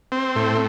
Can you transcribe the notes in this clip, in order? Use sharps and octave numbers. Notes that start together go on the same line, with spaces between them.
C4
A2